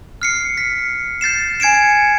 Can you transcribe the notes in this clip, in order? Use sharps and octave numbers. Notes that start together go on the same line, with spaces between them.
F6 C7 C#7
B6
G6 A6 C7 E7
G#5 G#6 C#7 D7 E7